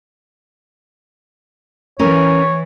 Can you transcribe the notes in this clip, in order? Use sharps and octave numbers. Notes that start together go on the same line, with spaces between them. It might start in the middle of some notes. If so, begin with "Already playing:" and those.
E3 C#4 A#4 C#5